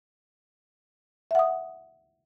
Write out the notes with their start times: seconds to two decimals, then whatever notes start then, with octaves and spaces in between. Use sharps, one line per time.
1.31 E5
1.35 F#5
1.39 D#6